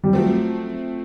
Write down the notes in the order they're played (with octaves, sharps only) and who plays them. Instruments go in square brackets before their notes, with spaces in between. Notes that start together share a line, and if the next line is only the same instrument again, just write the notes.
[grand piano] G3
[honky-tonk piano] F3 A3 C4 [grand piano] F#3